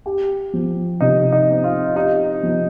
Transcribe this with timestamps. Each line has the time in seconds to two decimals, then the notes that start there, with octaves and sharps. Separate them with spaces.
0.06 G4
0.53 F3
1.01 C3 D#4
1.32 D#4
1.49 C4
1.64 F4
1.95 D#4 G4
2.43 F3